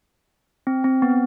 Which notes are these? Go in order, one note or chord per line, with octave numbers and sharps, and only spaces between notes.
C4
C4
B3